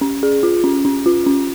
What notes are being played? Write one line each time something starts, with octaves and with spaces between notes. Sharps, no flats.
C#4
G#4
F4
C#4
C#4
F4
C#4